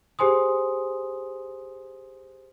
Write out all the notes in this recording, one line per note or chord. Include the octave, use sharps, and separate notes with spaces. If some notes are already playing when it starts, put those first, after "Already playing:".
G4 G#4 C5 G#5 C6 D#6